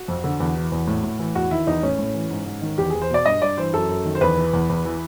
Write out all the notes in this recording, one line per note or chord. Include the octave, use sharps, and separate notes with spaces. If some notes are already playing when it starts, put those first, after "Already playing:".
Already playing: F#4
F2
D3
E2
E3
E2
A2
A2
E3
E2 F#4
D#3 E4
E2 D#4
A2 C#4
A2
E3
G#2
G#2
D#3
E2 G4
E2 G#4
C5
B2 D5
G2 D#5
G2 D5
E3 C5
F#2 A4
F#2
D#3
C5
E2 B4
E3
E2
E2
E3